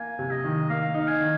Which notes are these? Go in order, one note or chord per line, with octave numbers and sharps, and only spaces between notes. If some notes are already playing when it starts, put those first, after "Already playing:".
Already playing: A#3 G#5
C3
D#5
D#3
A#3 F5
D#4
G#5
D#3